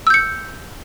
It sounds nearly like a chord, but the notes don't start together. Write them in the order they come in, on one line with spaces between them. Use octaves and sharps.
E6 G6 C#7